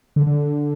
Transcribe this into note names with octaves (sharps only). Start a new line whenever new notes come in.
D3
D3